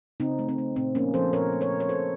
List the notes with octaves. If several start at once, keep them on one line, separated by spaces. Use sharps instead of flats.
C#3 C4 D#4
A3
C4
A3
A#2 C4
F3 A#3 C#4
F3 A4 C5
A#2 A#4 C#5
A3
A#4 C#5
A#2
C#5
A#2 A4 C5